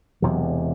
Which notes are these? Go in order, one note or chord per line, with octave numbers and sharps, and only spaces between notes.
E1 E2 C3 F#3